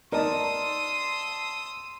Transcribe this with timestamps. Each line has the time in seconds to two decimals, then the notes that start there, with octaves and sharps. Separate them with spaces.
0.12 D#4 A#4 D5 A5 C6 D#6 E6